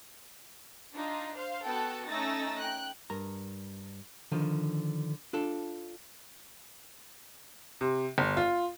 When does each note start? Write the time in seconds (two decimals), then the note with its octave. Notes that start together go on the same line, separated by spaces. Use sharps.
0.95 D4 D#4 F4
1.36 C5 F5
1.67 B3 F#4 A4 G5 A5
2.09 A3 C#4 D#4 E6 A6 A#6
2.61 G5 F#6
3.10 G2 A#4 A#5
4.32 D3 D#3 F3
5.33 D4 F4 A4
7.81 C3
8.18 G1
8.37 F4